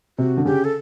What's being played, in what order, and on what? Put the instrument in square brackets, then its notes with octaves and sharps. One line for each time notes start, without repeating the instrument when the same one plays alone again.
[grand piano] C3 [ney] F#4
[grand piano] D3
[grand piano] C#3 [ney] G4
[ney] A4